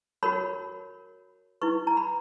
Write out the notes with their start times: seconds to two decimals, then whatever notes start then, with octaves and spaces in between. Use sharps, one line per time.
0.23 F#4 A#4 C#5 B5
1.62 E4 B4 C#6
1.87 A#5
1.97 B5